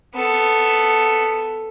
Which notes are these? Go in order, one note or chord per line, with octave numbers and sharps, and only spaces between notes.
B3 A4